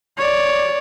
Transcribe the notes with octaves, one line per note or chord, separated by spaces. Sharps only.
C#5 D5